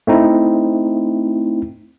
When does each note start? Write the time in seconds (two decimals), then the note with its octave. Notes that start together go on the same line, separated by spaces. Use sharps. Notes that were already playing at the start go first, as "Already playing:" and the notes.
0.07 A3 C4 D#4 E4